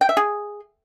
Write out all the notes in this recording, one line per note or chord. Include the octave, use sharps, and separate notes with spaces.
G5
E5
G#4